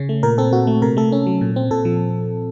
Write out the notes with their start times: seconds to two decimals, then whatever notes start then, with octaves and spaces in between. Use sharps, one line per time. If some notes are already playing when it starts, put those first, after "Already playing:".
Already playing: C#3 C#4
0.09 A3
0.23 A#2 A#4
0.38 C4 A4
0.53 A#2 F#4
0.67 A3
0.82 C3 A#4
0.97 A3 A4
1.12 C#4
1.26 F#3
1.41 A#2
1.56 C4
1.71 A#2 A4
1.85 F3